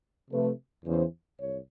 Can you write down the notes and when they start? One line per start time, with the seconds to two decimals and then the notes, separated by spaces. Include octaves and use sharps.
0.31 C3 F3 A3 B4
0.85 E2 C#3 E3 C5
1.39 C2 C#5